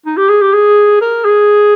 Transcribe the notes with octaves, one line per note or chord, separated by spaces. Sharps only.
D#4
G4
G#4
G4
G#4
A#4
G#4